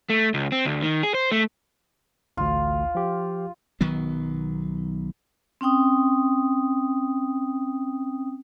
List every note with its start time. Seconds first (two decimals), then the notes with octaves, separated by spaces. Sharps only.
0.10 A3
0.34 C#2
0.52 C4
0.66 D2
0.82 D#3
1.03 G#4
1.14 C5
1.32 A3
2.37 A1 D2 F4
2.95 F3 G4
3.81 B1 D#3 F#3 B3
5.61 C4 C#4 G5 D#6